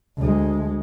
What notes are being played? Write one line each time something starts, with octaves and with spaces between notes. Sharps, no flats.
D2 G#3